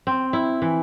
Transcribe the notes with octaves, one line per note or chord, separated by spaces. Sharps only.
C4
E4
E3